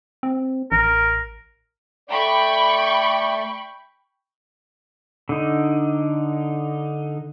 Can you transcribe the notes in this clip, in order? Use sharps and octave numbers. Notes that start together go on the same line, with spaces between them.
C4
A1 A#4
A3 D5 G5 B5 C#6
D3 D#4